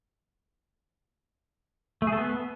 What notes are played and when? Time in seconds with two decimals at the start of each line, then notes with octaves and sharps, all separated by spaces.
2.02 A3
2.07 G#4
2.12 A4
2.18 B3